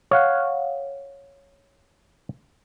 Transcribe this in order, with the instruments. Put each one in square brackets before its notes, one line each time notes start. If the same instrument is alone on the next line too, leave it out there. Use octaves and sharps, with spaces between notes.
[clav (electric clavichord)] C#5 F5 F#5